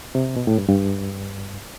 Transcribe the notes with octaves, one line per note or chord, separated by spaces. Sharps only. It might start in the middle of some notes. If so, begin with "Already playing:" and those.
C3
B2
A2
G2
G2